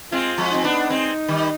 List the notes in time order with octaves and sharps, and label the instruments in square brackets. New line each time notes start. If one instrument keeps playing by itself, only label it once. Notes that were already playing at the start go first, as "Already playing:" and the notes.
[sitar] G#3 C4 [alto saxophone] F4
[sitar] F3 G#3
[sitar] C4 [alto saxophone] D#4
[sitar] B3 D4
G#3 C4
D#3 G3